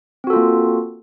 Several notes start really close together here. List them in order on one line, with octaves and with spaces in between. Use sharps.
C4 F#4 A4 F4 A#3